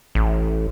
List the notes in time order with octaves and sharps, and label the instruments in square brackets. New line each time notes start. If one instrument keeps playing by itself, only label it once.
[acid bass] A1